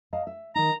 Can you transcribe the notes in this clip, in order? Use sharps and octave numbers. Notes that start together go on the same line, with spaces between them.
D#5 F5 A5
E5
D#3 D#4 A#5